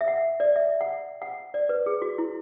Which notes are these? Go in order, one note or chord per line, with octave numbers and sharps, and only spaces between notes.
E5
F#5
D5
E5
F#5
F#5
D5
B4
G#4
F#4
E4